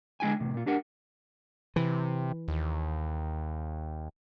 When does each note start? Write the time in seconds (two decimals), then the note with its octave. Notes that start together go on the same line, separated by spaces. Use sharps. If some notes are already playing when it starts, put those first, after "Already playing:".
0.20 D3 G#3 E4 G5 G#5
0.40 E2 A2 C3
0.54 A#2 F4
0.66 D4 G4 A#4 F#5
1.76 C3 E3
2.48 D#2